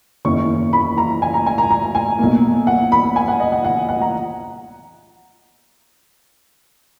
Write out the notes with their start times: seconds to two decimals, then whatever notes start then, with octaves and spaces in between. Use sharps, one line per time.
0.25 F#1 E2 D#3 A#3 C#4 C#6
0.73 B5
0.98 A#5
1.22 G#5
1.34 A#5
1.46 G#5
1.58 A#5
1.71 A#5
1.95 G#5
2.19 B1 B2 A#3
2.67 F#5
2.92 B5
3.16 G#5
3.28 F#5
3.40 D#5
3.52 F#5
3.65 F#5
3.89 F#5
4.02 A#5